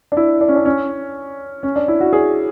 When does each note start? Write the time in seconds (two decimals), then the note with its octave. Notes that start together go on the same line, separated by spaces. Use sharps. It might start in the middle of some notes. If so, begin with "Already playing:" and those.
0.12 D4
0.17 E4
0.41 D4
0.48 C#4
0.56 D4
0.65 C#4
1.63 C#4
1.76 D4
1.88 E4
2.01 F#4
2.13 G#4